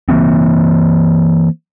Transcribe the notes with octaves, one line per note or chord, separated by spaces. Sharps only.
E3 A#3 C4